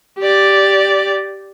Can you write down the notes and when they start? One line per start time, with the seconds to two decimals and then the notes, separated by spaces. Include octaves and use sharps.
0.19 G4 D5